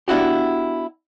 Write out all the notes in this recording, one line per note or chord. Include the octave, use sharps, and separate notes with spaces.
B3 D4 E4 F#4 G4